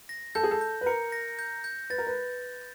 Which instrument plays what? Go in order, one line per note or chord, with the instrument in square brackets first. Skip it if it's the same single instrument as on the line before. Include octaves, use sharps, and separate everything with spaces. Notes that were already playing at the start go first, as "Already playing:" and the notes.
[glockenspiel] A#6
[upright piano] A4 [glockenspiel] G6
[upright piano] G#4
A4
[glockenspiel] G6
[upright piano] B4
[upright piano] A#4 [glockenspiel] C#7
[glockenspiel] A#6
G6
G6
[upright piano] B4 [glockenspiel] A6
[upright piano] A#4
B4